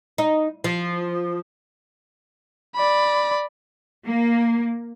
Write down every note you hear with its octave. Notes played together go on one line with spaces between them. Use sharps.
D#4
F3
D5 B5
A#3